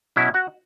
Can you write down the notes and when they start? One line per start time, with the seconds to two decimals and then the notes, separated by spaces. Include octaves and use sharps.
0.16 B2 F#3 C#4 E4 E5
0.34 F#4 F#5